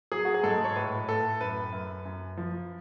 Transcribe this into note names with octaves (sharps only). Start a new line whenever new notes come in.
F#3 G#4
F#4
G#4
G#2 A4
C#5
A2 B4
A2 A4
F#2 B4
F#2
F#2
F3